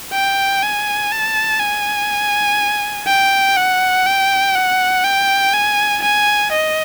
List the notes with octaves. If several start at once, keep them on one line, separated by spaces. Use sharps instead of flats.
G5
G#5
A5
G#5
G5
F#5
G5
F#5
G5
G#5
G#5
D#5